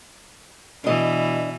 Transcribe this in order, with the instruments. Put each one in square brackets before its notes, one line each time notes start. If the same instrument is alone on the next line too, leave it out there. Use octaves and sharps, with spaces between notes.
[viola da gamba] B2 E3 [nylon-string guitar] D4 D#5